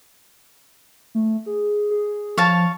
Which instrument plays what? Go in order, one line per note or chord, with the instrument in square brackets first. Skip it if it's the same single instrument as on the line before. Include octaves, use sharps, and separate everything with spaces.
[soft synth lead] A3
G#4
G#4
[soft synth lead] F3 [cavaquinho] C#5 F5 A5